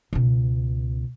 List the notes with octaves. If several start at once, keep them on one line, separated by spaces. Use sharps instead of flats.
C#2 B2